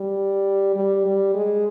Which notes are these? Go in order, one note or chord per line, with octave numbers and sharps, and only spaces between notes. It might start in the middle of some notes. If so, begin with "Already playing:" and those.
Already playing: G3
G3
G3
G#3